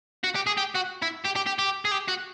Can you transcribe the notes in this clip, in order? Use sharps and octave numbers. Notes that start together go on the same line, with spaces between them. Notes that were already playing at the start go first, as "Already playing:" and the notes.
F#4
G4
G#4
G4
F#4
E4
G4
G4
G4
G4
G#4
G4
F#4